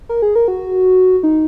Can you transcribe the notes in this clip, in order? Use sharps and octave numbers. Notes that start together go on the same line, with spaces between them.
A#4
G#4
A#4
F#4
D#4